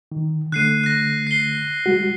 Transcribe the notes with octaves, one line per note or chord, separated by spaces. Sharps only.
D#3
D3 A3 F#6 C7 D#7
F#6 A#6
C7 G7
G3 G#3 F#4